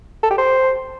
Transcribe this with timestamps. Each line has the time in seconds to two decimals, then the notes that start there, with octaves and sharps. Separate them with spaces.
0.23 A4
0.31 G4
0.38 C5